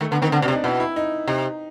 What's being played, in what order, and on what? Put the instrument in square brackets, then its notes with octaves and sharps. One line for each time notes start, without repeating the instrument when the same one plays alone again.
[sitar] D#3 [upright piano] A3
[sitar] D3 [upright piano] B3
[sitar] D#3 [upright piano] C4
[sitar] D3 [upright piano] D4
[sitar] B2 [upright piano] D4
[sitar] C3
[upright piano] D#4
[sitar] B2 [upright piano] E4
[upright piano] E4
D#4
[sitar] C3 [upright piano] D#4